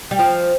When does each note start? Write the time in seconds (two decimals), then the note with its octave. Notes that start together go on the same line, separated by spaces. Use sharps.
0.11 G3
0.19 F3